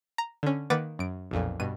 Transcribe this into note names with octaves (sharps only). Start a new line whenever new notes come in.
A#5
D3 C#4
D#3 A#3 B4 F#5 D6 A6
F#2 D7
B1 F2 A#2
G2 B2 D#7